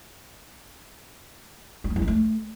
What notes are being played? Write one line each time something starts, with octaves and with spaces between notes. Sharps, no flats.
F#3
A3
E2
D#3
A3